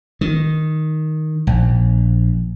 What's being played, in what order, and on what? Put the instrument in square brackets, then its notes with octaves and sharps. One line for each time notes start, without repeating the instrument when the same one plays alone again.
[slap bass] D#3
A#1